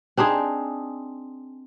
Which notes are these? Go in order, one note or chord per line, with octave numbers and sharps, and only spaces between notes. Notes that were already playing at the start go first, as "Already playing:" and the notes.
C4 D4 D#4 G#4